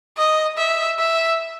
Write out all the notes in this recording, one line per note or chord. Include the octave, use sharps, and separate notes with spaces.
D#5
E5
E5